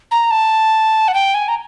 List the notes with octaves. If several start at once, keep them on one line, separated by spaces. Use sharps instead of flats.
A#5
A5
F#5
G5
G#5
A#5